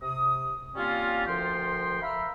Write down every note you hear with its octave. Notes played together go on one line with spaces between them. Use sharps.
C3 D#6
G3 A#3 C4 C#4 F4
D2 F3 A#4 G5 C6
E5 F5 A#5 B5 E6 F6